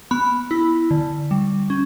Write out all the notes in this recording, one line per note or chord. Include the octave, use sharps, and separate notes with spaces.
B3 B5
E4
D3
G3
C#4